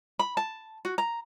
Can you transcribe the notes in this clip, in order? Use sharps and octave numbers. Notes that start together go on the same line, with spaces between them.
B5
A5
F#4
A#5